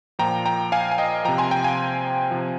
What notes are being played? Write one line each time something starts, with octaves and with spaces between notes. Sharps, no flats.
A#2 F3 G5 A#5
G5 A#5
F5 G#5
G#5
D#5 G5
C3 F3 G5 A#5
G#5 C6
G5 A#5
F5 G#5
C3 F3